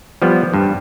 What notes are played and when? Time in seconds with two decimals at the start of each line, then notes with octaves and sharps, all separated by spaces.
0.22 F3 G3 B3
0.54 G2